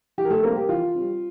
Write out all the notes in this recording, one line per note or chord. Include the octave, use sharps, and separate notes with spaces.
E3 G4
A#4
A3 A4
G3 A#3 C4 A#4
G4
E3 F4
G3 C4